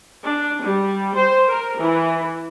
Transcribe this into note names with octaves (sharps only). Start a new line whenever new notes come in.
D4
G3
C5
A#4
E3